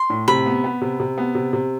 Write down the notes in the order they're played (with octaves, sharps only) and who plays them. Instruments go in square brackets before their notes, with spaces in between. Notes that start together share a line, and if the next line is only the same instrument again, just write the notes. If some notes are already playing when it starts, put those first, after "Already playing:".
Already playing: [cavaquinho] C6
[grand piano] A2
[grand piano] C3 [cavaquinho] B5
[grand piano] B3
B3
C3
C3
B3
C3
C3